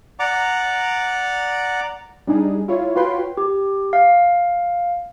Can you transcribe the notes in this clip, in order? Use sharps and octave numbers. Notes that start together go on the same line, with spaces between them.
D5 F#5 A#5 D6
G3 D4 D#4 G#4
E4 F4 C#5
F4 F#4 B4 C#5 G5 C6
G4
F5